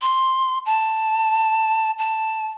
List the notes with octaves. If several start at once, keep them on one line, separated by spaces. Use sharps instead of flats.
C6
A5
A5